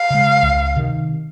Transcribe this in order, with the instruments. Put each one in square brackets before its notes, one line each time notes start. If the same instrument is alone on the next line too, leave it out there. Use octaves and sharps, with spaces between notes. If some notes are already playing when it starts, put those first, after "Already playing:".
Already playing: [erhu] F5
[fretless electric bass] C#3 G#3
C#2
C3 D#3